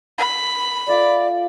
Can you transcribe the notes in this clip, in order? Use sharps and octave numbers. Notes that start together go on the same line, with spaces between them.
B5
A3 F4 D5 F#5